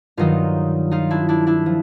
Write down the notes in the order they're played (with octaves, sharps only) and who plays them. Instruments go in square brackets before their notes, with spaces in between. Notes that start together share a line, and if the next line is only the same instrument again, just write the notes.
[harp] G2 D#3 F#3 D#4 F4
D#4 F4
D4 E4
D4 E4
D4 E4
F3